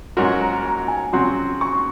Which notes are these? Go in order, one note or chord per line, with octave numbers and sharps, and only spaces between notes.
G#2 F#3 C#4 F#4 A#4 C6
A#5
A#5
G#5
C#3 F#3 C4 F#4 C6
C#6